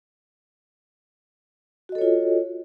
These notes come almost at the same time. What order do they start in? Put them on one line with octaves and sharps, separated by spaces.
F#4 D#5 A4 C#5 F4